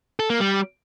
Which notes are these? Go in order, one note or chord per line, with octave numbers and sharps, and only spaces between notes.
A4
A#3
G3